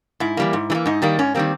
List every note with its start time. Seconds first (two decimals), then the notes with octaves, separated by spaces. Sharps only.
0.20 G#2 E4
0.37 E3 G3 A#3
0.53 G#2
0.70 E3 G3
0.75 A#3
0.86 G#2 D#4
1.02 D#3 G3 A#3
1.19 G#2 C#4
1.35 D#3 G3 A#3 C4